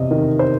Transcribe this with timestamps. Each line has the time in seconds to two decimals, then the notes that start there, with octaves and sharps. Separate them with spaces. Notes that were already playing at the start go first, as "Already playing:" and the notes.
Already playing: E2 C3 D#5
0.11 D#3
0.39 C5